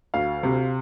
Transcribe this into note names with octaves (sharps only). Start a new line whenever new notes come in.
D2 F5
C3